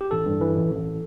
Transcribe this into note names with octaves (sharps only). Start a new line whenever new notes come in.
G4
A1 A4
G2
E3
A1
A1